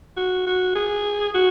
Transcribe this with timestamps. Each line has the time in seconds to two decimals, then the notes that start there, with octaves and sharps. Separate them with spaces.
0.17 F#4
0.47 F#4
0.75 G#4
1.35 F#4